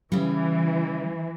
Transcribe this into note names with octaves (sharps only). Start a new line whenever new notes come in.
C#3 E3 G3